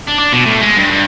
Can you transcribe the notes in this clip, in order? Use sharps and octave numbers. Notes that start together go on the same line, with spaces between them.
D4
D4
B2
A2
G#3
G2
G2